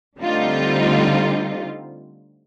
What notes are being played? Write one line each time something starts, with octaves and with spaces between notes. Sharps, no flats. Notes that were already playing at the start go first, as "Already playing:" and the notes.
D3 G3 A3 C4 D#4 F4